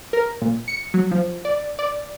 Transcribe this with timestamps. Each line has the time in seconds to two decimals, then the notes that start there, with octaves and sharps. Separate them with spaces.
0.13 A#4
0.42 A#2
0.68 C#7
0.94 F#3
1.11 F3
1.45 D5
1.79 D5